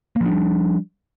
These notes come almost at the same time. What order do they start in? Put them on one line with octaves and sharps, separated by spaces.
A#3 F3 D4 G3